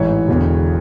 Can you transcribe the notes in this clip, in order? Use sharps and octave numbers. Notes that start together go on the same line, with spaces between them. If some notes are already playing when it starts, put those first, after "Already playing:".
Already playing: A1 G#2 E3 C#5
E1 E2 D3